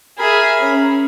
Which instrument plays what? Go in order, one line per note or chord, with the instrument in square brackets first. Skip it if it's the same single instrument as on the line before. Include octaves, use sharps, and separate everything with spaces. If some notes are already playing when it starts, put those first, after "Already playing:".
[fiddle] G#4 E5 [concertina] A#4 B5
[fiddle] C#4